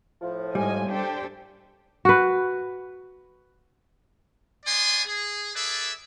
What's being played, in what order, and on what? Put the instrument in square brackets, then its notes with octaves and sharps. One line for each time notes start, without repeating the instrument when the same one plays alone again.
[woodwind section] A2 F3
[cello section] G#2 [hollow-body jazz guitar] G3 [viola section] D#5 G#5
[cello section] D4 G4 A4 [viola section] C5 G5
[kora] F#4 B4
[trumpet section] B3 D5 D#5 G#5 C6
G#4
G#4 A4 B4 D5 E5